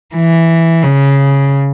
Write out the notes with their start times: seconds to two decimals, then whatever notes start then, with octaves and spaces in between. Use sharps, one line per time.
0.15 E3
0.83 C#3